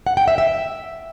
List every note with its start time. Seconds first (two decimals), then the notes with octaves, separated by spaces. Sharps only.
0.07 F#5
0.17 G5
0.28 E5
0.38 E5